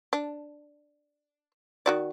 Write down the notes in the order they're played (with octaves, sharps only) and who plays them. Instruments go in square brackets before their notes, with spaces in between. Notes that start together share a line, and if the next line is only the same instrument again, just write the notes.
[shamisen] D4
D#3 F#4 D5